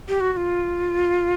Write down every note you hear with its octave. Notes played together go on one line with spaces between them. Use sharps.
G4
F#4
F#4
F4